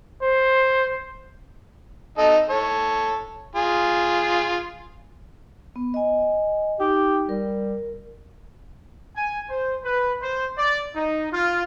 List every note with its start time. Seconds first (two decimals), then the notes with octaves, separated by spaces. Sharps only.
0.22 C5
2.18 D#4 A4 D#5
2.50 A4 C#5
3.55 F4 G#4
5.76 B3
5.94 D#5 G#5
6.80 D#4 G4
7.29 G3 A#4
9.16 G#5
9.49 C5
9.84 B4
10.21 C5
10.58 D5
10.96 D#4
11.32 F4